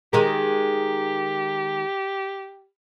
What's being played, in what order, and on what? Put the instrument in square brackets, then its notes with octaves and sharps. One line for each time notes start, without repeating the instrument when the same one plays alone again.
[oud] D#3 G#3 A#4 [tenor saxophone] G4